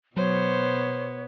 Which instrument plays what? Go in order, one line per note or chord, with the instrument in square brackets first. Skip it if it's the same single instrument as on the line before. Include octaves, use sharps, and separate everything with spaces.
[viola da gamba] B2 B3 [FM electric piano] F#3 [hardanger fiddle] C5 [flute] C#5